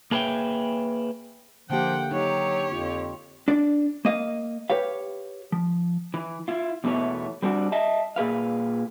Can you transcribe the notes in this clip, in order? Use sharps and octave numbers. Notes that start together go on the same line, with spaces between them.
A#3 G#4 B4 C#5 E5 G5
D3 F3 A#3 G4 F#5 G5
F#3 D#4 G4 C#5
F2 F4
D4 D5
A#3 D#5 F5
G4 B4 C#5 F5
F3
E3
E4 F4
E2 B2 E3 A3 E4 C#5
G3 C4 D4 F#4
D#5 E5 A5
A#2 G#4 B4 F5